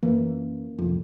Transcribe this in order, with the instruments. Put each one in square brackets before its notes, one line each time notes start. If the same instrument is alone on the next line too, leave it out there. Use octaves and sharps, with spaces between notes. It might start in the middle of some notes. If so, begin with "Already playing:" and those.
[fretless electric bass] F#2 E3 [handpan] A#3 C#4
[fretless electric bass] D1 C2 F2